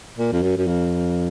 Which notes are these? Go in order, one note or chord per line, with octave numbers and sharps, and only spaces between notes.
A#2
F2
F#2
F#2
F2